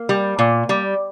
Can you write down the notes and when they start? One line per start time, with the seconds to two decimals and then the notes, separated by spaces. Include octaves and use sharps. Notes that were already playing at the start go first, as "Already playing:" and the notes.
Already playing: A#3
0.09 G3
0.39 A#2
0.69 G3